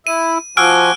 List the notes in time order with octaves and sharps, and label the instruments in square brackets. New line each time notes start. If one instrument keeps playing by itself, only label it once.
[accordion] E4 [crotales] D#7
[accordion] F3 [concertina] F#4 G#5 D6 [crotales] E6 F6 D7